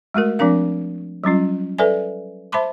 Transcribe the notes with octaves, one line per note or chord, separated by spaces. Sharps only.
G#3 A3 F#4 A#4
F3 C4 D4 A#4 F5
F#3 G3 C#4 F4
A4 B4 D5 E5 G#5
C5 E5 A5 B5 C6 D6